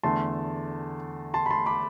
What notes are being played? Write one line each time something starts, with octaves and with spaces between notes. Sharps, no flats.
E2 D3 A3 A5 C6
A5 C6
B5
A5 C6
B5 D6